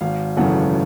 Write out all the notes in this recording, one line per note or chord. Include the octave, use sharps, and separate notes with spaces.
G#1 F5
F#2 C#3 E3 A3 F#5